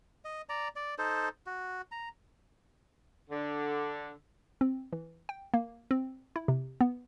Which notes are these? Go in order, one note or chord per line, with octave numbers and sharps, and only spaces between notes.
D#5
D5 A#5
D5
D#4 A4 C5
F#4
A#5
D3
C4
E3
G5
A#3
C4
E4
C3
B3